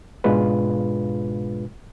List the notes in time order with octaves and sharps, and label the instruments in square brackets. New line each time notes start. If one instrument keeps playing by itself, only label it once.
[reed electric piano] G#2 B2 G#3 D4 F4 B4